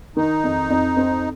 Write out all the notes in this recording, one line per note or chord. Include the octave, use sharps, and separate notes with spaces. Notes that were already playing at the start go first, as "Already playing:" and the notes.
D#3 D#4
F2
F2
C4